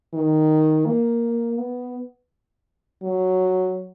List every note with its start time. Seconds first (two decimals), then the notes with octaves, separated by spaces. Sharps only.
0.14 D#3
0.86 A#3
1.58 B3
3.03 F#3